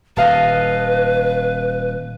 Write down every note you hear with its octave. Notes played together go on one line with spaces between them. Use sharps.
D#1 B4 D#5 F5 A5